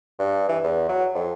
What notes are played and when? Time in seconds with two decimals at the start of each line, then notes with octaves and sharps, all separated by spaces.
0.19 G2
0.49 E3
0.64 E2
0.89 F#3
1.15 F2